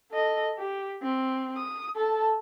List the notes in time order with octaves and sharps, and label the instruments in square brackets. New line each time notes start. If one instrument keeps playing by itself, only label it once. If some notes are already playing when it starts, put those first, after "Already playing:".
[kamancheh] A4 D#5
G4
C4
D#6
A4 A5